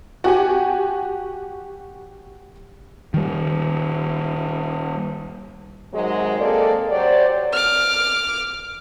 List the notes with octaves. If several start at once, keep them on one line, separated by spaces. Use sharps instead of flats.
F#4 G4 G#5
D#3 G3
G#2 C3 D#3 F#3 G#3
G#3 A#3 C4 A4 D5
F#3 G4 C5 D5
D6 F6